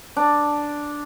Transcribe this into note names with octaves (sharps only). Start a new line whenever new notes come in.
D4